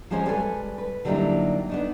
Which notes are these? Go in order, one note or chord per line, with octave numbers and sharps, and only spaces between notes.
F3 F#3 G#3 C#4 A#4 C5
G3 G#3 G4 A4 B4 G#5
B4
D3 F#3 G3 A#3 D#4 E4
B3 D4 D#4